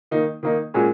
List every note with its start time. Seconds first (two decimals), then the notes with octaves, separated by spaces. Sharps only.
0.11 D#3 A#3 D#4
0.43 D#3 A#3 D#4
0.74 A#2 G#3 C#4 F#4